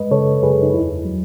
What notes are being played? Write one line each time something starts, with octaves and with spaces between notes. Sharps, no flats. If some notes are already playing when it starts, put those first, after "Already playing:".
Already playing: F#2 G#3 B4 D#5
C#3 A4 C#5
F#2 G#4 B4
D#4
E2 E4
F#3